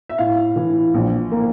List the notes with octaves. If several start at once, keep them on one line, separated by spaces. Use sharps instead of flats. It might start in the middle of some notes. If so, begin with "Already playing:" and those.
E5
A2 F5
E3
A#1
A#3